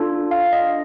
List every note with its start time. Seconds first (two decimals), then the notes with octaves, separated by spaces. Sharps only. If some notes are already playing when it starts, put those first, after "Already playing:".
Already playing: D4 F4 A4
0.31 F5
0.53 D#5